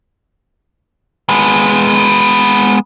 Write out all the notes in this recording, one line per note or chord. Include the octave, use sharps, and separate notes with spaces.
G#3 B3